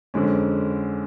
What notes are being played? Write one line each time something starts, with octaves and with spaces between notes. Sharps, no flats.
F2 D3 G#3 C#4